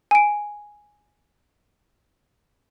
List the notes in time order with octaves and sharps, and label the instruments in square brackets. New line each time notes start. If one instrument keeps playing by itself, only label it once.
[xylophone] G#5 D7